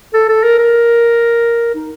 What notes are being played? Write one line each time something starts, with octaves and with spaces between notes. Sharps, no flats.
A4
A4
A#4
A#4
D#4